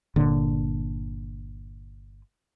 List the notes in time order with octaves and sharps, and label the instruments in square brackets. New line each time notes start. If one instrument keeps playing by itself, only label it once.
[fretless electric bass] G1 A#2 D3